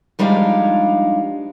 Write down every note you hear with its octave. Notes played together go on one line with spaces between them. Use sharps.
F3 G3 G#3 D4 D#4 F5